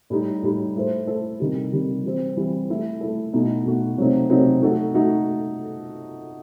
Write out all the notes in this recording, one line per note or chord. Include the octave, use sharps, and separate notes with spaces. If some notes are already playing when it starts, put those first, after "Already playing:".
A2 G3 D#4
A2 G3 D#4
A3 E4 A4 C5
A3 E4 A4 C5
C3 D#3 G3
C3 D#3 G3
E3 G3 C4
E3 G3 C4
A3 E4 A4
A3 E4 A4
B2 A3 D#4 F#4
B2 A3 D#4 F#4
C3 F#3 A3 C4 D#4
C3 F#3 A3 C4 D#4
A3 D#4 F#4 A4
A3 D#4 F#4 A4